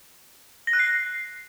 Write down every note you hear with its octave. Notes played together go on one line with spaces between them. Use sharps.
A#6
F#6
C7